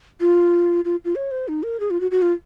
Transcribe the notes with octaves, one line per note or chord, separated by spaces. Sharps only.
F4
F4
F4
C#5
C5
D#4
A#4
G#4
F4
F#4
F#4
F4